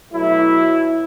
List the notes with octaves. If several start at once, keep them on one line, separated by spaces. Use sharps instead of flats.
B2 F#3 A3 E4